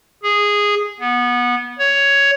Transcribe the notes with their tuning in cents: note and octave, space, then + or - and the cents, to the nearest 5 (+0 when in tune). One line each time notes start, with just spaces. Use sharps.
G#4 -10
B3 -20
C#5 +10